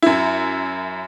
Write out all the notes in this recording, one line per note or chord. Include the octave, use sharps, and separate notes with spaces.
F#2 E4